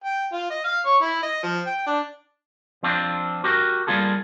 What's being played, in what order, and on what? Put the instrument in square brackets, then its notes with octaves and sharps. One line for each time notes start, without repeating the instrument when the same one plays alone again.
[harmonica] G5
F4
D#5
F5
C#5
E4
D#5
F3
G5
D4
[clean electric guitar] F3 C4 D4 F4
F#4 G4 A#4
G3 A#3 F4 G#4 A4